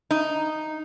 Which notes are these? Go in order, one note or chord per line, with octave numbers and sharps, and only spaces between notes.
D#4